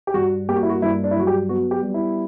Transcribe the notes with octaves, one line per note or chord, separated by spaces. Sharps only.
G4
G2 F#4
A#3 G4
F#4
E4
F#4
G2 E4
D4
E4
F#3 F#4
G4
B3 F#4
G4
G3
E4